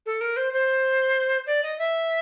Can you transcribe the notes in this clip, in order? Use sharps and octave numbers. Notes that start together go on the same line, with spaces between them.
A4
A#4
C5
C5
D5
D#5
E5